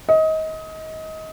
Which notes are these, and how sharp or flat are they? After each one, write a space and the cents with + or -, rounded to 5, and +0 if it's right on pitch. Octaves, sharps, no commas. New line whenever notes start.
D#5 +25